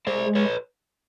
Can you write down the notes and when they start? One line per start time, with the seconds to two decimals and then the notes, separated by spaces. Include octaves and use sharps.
0.07 G#3 C5 D5
0.35 B4 C#5